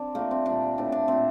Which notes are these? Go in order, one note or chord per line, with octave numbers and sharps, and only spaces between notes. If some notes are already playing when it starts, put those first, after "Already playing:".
Already playing: C4 D4
D3 F3 A3 A#3
C4
A#2 G3 D4
A2 E3 A3 D4
D4
A#2 A3 C4